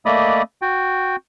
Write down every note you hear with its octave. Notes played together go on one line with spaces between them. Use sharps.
A3 A#3 D5 D#5 B5 D#6
F#4 G5